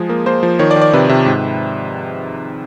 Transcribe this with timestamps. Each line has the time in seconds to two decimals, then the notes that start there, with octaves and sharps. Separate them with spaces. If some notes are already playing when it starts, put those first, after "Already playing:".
Already playing: F3 G#3 G#4
0.09 A#3
0.26 A#3 C5
0.43 F3
0.59 D#3 C#5
0.71 D5
0.76 D#3
0.81 D5
0.93 C3 B4
1.09 C3
1.26 G#2